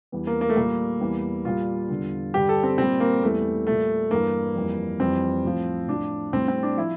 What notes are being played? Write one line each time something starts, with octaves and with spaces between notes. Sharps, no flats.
E2 E3 G3
A#3
A#3
A3
A#2 G3 A#3
E2 E3 G3
A#2 G3 F4
E2 D3 G3
G2 D3 G3 G4
A4
C4
A#2 G3 C4
A#3
E2 E3 G3 A3
A#2 G3 A3
G2 E3 G3 A#3
F2 E3 G3
F2 E3 G3 C4
A2 F3
A2 F3 D4
A2 G3 C4
C4
D4
F3 E4